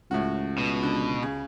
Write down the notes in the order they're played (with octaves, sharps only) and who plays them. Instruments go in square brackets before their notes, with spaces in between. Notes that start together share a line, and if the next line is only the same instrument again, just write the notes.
[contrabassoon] C#2 [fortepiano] A2 F#4
[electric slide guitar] B2
[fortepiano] D3
C#3